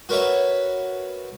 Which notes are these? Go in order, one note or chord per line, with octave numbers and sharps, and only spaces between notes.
F#4 A#4 B4 C#5 E5